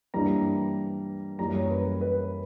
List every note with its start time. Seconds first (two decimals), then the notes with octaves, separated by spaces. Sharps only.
0.14 G2 E3 G3 A#3 A#5
1.39 F#2 E3 G3 A#3 A#5
1.54 C#5
1.70 B4
1.86 A#4
2.01 B4